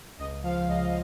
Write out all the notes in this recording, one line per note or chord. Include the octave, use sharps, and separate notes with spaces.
C#2 D#5
F3 F5
F5
C#2 D#5